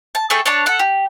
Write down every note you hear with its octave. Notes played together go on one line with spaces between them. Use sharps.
A5
A3 G#4 A4 G5
D4 C#5 A5
A4 F#5
G4